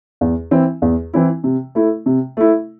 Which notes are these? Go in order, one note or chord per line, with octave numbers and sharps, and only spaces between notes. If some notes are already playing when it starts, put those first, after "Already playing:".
E2
E3 C4 E4
E2
E3 C4 E4
C3
A3 E4
C3
A3 E4